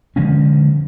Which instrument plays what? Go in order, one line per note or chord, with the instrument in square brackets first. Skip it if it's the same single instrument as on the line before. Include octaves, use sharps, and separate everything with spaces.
[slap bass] D3 F3 G#3 C#4